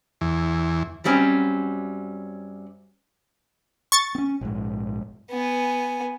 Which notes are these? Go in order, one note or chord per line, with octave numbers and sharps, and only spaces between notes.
E2
F#2 F#3 G3 C4 C#4
C#6 A6
C4 C#4
A#1 G#2
B3 G#5